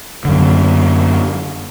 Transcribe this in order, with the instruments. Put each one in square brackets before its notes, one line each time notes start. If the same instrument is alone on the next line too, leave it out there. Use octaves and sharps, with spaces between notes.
[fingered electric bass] F#2 D3